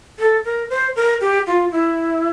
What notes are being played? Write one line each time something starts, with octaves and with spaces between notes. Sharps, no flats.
A4
A#4
C5
A#4
G4
F4
E4